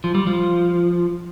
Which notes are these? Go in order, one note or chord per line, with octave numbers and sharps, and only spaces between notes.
F3
G3
F3